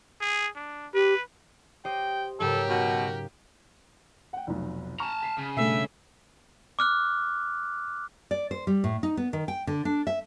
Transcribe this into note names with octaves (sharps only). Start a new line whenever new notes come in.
G#4
D4
G4 B4
G4 C5 D#5 G5
G#2 C#3 F#3 G4 A4 A#4
B2 F#4 F5
F#5 G5
F1 B1
A5 A#5 C#6 F6
B6 C7
C#3
G2 B2 A3 A4 E5 C7
D6 F6 F#6
D5
C5
G3
A2
D#4
B3
D#3
G5
D3
D4
E5